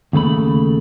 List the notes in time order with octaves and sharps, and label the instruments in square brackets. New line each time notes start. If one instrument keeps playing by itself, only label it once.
[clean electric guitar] D#2 C#3 A3 B5